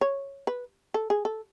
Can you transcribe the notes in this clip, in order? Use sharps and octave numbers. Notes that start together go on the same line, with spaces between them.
C#5
B4
A4
G#4
A4